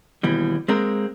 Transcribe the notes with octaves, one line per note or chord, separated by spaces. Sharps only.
D#2 B2 E3 G3
G#3 A#3 C4 A#4